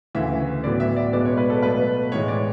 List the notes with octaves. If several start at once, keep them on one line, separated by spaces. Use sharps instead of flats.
D2 C#3 E3 A3 E5
A2 F#3 B3 D5
E5
D5
B2 G#3 B3 D5
C#5
B4
A4
B2 F#3 A3 B4
A2 E3 G#3 C#5
D5